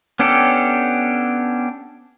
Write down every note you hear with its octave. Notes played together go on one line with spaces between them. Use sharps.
B3 C#4 D4 G4 A4